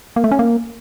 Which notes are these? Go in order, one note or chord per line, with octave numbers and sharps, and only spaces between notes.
A#3
A3
C#4
A#3